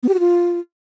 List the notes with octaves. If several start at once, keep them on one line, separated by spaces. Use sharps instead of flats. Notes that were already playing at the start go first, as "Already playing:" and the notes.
B3
G4
F#4
F4